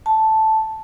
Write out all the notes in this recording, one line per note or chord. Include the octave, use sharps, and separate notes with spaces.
A5